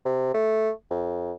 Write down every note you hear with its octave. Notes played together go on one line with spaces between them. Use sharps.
C3
A3
F2